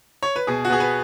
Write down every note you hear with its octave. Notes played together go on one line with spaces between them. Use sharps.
C#5
B4
B2 G#4
F#4
B3 G#4
B4